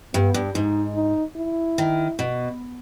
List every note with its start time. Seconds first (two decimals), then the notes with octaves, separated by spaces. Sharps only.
0.14 G2 B3
0.34 G2
0.55 G#2 D#4
0.95 D#4
1.36 E4
1.78 D#3
2.19 B2